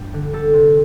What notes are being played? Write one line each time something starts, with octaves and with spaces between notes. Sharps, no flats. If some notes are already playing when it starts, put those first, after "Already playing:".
Already playing: G2 G3
D3
G3 A4
C3